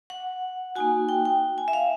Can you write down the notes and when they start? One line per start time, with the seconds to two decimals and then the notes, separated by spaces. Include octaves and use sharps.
0.10 F#5
0.76 A#3 D#4 F#4 G#5
1.09 G5
1.25 G5
1.58 G#5
1.68 E5
1.73 F5